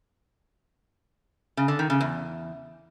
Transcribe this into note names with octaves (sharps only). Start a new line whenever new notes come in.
C#3
D3
D#3
C#3
E2